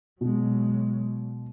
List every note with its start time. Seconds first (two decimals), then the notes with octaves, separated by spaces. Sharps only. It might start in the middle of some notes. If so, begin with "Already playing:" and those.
0.21 B2 F#3 G#3